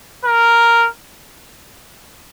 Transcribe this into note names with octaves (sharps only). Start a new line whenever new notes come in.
A#4